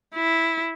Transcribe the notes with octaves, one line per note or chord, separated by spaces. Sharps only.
E4